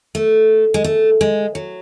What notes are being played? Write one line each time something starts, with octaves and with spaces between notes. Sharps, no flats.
A3
G#3
A3
G#3
F#3